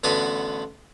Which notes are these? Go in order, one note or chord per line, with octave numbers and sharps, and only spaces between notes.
A1 D3 B3 F#4 B4